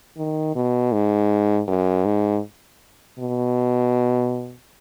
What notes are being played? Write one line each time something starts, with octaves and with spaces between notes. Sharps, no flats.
D#3
B2
G#2
F#2
G#2
B2